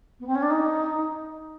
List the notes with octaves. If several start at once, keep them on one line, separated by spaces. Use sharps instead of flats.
B3
C4
C#4
D4
D#4